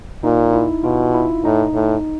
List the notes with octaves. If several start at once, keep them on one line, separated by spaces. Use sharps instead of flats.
A#2 D#4
E4
B2 F4
E4
A2 D#4
A2